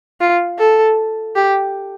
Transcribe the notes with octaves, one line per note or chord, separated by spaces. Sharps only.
F4
A4
G4